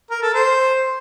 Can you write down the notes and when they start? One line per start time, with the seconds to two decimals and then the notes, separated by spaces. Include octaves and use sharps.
0.11 A#4
0.22 A4
0.34 C5